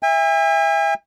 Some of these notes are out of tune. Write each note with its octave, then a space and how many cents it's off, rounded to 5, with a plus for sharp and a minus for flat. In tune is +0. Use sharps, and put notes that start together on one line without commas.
E5 +0 G#5 -45